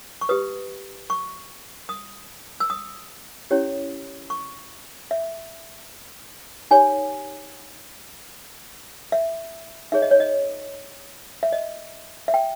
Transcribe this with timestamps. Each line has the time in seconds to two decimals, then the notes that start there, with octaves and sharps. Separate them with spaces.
0.21 C#6
0.29 G4 B4 D#6
1.10 C#6
1.89 D#6
2.60 E6
2.70 D#6
3.51 C#4 E4 G4 C#5
4.30 C#6
5.11 E5
6.71 D#4 G4 C#5 G#5
9.12 E5
9.92 D#4 G#4 C#5 E5
10.02 D#5
10.11 C#5
10.20 D#5
11.43 E5
11.52 D#5
12.28 E5
12.34 G5